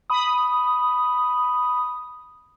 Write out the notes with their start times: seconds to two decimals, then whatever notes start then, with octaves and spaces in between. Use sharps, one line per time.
0.10 B5 D#6